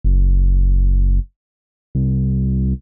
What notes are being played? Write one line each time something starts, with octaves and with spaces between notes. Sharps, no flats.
F#1
C2